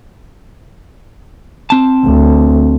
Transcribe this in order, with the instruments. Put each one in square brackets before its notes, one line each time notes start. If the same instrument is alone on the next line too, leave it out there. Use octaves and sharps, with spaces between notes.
[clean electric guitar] C4 A5
[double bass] D2